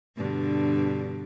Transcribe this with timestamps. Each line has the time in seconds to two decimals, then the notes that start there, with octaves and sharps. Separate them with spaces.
0.17 G2 B2 D3